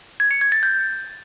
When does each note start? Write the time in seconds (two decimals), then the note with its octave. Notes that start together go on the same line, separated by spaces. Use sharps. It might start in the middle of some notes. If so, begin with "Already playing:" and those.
0.20 G#6
0.31 C#7
0.41 G#6
0.52 A6
0.63 G6